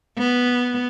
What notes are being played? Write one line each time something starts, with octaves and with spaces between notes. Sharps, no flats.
B3